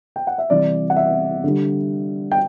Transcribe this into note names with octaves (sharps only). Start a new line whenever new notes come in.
G5
F#5
E5
C3 E3 G3 D5
F#5
E5
D3 G3
G5